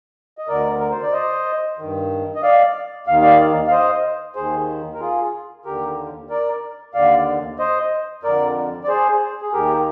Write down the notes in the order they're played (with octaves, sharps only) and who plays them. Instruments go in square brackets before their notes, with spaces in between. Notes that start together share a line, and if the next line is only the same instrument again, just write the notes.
[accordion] D#5
D2 D3 A#4 D5
A#4
C5
D5
C5 D#5
G2 D#3
D#5
D5 F5
D#2 D#3 F5
D5 F5
F5
C5 D#5
D#2 D#3 G#4 C5
A#4
F4 G#4
D#2 D3 G4 A#4
A#4 D5
D#2 D3 D5 F5
C5 D#5
F2 D3 A#4 D5
D5
G#4 C5
G#4
D#2 D#3 G4 A#4